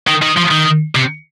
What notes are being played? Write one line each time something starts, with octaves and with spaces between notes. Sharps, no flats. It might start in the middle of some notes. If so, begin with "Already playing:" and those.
D#3
D#3
F3
D#3
C3